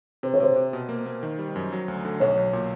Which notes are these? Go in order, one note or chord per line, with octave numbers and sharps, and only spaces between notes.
C3 C5
C#5
C3 C5
C3
B2
A#3
A#3
D#3
G3
F#2
F#3
D2
D3
B1 C#5
B1
A#2